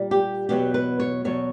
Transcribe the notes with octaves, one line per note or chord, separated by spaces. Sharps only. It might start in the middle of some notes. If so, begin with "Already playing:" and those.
Already playing: A#2 G3
G4
E2 B2 F#3 G4
B4
C#5
E2 B2 F#3 C#5